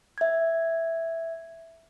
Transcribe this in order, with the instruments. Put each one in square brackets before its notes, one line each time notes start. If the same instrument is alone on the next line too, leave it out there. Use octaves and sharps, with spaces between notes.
[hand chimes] E5 G#6